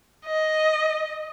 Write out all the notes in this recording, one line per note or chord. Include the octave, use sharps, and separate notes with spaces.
D#5